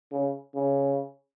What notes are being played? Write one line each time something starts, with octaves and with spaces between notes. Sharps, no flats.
C#3
C#3